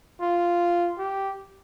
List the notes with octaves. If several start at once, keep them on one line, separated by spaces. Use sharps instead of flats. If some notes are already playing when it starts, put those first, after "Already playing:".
F4
G4